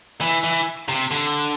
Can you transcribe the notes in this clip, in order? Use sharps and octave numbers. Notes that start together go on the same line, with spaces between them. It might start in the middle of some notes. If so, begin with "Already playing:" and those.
E3
E3
C3
D3